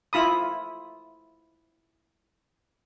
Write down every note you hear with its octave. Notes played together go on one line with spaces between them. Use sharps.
E4 F4 B5 D#6